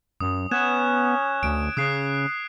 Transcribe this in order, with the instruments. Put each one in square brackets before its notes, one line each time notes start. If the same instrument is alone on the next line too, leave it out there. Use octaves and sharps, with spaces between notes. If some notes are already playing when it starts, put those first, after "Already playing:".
[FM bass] F#2 [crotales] D#6
[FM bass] B3 [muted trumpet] C#4 [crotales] F#6 G#6 E7
[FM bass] D2 [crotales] D7
[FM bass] C#3 [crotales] D#6 F#6 C7